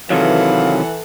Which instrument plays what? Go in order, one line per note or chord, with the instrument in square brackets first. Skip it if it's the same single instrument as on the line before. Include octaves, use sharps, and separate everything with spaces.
[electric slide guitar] C3 D#3 F#3 [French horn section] E3 [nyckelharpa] A4 F#5 [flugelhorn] F5